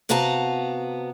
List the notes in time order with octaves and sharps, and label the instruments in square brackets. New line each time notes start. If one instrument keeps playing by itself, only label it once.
[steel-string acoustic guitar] C3 B3 F#4 F5 A5 A#5